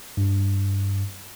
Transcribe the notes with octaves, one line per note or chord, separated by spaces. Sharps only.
G2